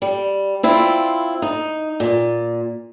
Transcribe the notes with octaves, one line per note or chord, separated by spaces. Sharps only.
G3
C4 E4 F4
D#4
A#2